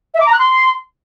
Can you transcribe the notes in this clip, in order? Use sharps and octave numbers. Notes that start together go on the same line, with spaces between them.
E5
D6
A#5
F#6
C6